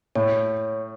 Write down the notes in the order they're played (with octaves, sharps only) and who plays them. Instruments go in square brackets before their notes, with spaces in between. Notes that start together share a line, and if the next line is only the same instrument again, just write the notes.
[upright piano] A2 [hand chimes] C#5